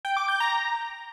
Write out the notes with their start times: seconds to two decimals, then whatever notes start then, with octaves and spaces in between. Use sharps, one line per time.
0.05 G5
0.17 D6
0.28 G6
0.40 A#5